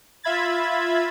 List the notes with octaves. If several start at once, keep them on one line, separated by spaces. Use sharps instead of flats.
F4 E5 B5 G#6 A6